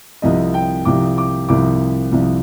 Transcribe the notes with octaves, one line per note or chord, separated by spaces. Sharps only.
C2 C3 F3 D#5
G5
C2 C3 F3 D6
D6
C2 C3 F3 D6
C2 C3 F3